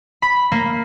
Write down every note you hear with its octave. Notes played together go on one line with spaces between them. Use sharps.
B5
A#3